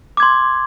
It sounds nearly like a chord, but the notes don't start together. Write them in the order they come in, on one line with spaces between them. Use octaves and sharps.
D6 G#6 C6